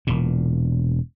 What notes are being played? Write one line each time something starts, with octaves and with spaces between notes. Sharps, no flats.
E1 A#2